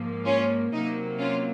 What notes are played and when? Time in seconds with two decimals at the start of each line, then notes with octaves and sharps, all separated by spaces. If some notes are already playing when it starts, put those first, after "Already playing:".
Already playing: G#2 F3 A#3
0.25 C#4 F4
0.72 C3 F#3 A#3 D#4
1.18 C#4 F4